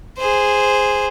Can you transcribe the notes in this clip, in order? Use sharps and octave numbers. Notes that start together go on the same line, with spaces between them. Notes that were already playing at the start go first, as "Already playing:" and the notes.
G#4 C5